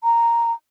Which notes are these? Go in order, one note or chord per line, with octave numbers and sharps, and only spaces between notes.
A#5